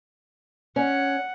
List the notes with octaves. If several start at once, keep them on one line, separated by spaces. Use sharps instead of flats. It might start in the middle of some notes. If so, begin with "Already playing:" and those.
C#4 F#5